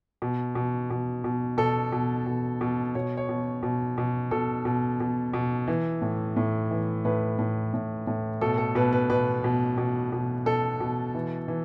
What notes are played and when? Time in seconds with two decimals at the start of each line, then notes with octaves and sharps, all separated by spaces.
0.22 B2
0.55 B2
0.90 B2
1.24 B2
1.58 B2 A4
1.92 B2
2.26 B2
2.61 B2
2.95 B2 C#5
3.17 C#5
3.29 B2
3.63 B2
3.98 B2
4.31 B2 A4
4.65 B2
5.00 B2
5.33 B2
5.68 E3
6.02 A2
6.36 A2
6.71 E3
7.05 A2 B4
7.39 A2
7.74 A2
8.07 A2
8.41 B2 A4
8.58 A4
8.75 B2 B4
8.93 B4
9.10 B2 B4
9.44 B2
9.78 B2
10.12 B2
10.46 B2 A4
10.80 B2
11.15 E3
11.48 E3